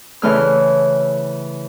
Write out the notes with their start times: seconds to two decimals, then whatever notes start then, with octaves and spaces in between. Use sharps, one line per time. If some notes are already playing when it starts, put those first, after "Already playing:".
0.22 C#3 E3 A3 F6